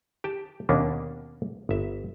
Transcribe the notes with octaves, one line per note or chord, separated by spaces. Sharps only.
G4 G5 A5
D#2 B2 A#3 C#4 D4
G1 E5